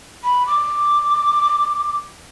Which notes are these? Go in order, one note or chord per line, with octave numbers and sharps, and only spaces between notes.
B5
D6